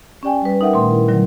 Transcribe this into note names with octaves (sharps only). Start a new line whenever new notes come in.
C#4 G4 D5 G5 G#5
G3 B4
D#4 A#4 E5 F#5 G5
A#2 D#3 A3 E5 C6
E4 A#4
D3 F#3